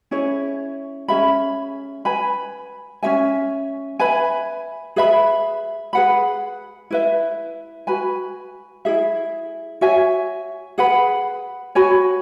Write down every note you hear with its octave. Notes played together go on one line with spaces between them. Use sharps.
C#4 E4 G#4 C#5
C#4 G#4 E5 B5
B4 G#5 B5
C#4 F#4 E5 G#5
B4 E5 G#5 B5
G#4 B4 E5 B5
G#4 B4 F#5 B5
E4 B4 E5
F#4 B4 G#5 B5
E4 G#4 E5
F#4 C#5 E5 G#5
G#4 B4 F#5 B5
F#4 C#5 G#5 B5